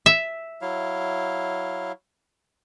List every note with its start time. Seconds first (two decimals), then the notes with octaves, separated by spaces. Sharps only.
0.06 E5
0.62 F#3 E4 F5